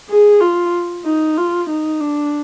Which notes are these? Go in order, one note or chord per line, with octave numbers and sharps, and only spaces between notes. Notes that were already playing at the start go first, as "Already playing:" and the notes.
G#4
F4
D#4
F4
D#4
D4